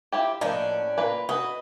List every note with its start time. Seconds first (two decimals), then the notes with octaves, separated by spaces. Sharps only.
0.12 E4 F4 G4
0.41 A2 F3 A#3 C#4 D4 D#5
0.98 A#3 F4 B4
1.29 F#4 B4 D#5